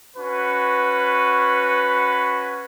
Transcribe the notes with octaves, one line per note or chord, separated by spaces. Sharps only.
C#4 F#4 B4